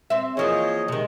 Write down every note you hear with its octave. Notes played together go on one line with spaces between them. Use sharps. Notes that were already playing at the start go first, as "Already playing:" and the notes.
C4 E5
E2 F3 A#3 G#4 C#5 D#5
C3 D#3 G#3